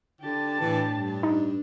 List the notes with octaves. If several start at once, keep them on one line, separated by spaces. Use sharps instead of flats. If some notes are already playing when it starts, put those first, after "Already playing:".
D3 G4 A5
A2 E3 D4
G2
D4 D#4